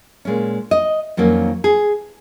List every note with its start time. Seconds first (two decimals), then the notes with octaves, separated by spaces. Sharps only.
0.25 A#2 G#3 C#4
0.71 D#5
1.17 F2 D#3 F#3 A#3 C#4
1.64 G#4